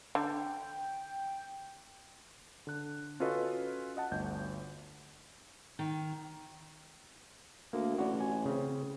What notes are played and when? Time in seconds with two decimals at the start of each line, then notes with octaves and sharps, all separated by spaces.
0.15 D3 G5
2.67 D3 F#6
3.20 C#4 F4 F#4 A4 B4 D#5
3.97 D#5 F#5 A5
4.11 G1 D2 G6
5.79 D#3
7.73 D2 A#3
7.98 A1 F#4 D5
8.20 G#5
8.45 C#3 C4